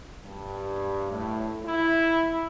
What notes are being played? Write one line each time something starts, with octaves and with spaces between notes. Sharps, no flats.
G2
A2
E4